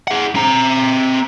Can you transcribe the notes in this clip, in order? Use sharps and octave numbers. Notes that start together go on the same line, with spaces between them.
G#4 F#5
C4 A#5